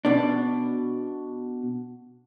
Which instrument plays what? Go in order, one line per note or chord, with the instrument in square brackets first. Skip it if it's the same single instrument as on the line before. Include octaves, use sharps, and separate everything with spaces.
[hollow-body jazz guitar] B2 D4